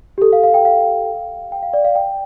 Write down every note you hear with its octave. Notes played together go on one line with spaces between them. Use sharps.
G4
A4
F5
F5
G5
F5
G5
F5
D5
F5
G5